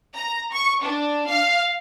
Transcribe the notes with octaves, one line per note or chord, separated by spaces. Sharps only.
A#5
C#6
D4
F5